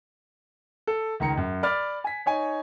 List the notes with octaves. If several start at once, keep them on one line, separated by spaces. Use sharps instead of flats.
A4
C#2 D#3 A#5 C#7
F#2
D5 B5 D6 F6 A6
G#5 B6
D#4 C#5 G#5